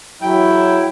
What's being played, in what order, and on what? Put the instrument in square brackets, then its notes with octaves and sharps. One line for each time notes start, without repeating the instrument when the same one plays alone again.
[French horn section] E2 F#3 [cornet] E4 [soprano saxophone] G5